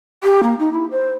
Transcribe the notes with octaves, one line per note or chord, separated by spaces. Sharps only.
G4
A#3
D#4
E4
C5